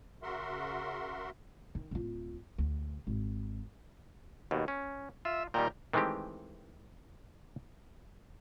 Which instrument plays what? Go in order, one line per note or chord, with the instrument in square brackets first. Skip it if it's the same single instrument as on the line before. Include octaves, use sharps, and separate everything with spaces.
[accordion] C#3 F#4 A#4 E5 F#5 C6
[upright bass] D#3
D1 F4
D2
G#1
[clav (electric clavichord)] D#2 B2
C#4
[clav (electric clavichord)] F4 [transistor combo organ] E5
[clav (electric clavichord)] A#2 D#3 G3 [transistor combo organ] A#4 G5
[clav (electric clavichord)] D#3 E3 G#3 A3 C4 G4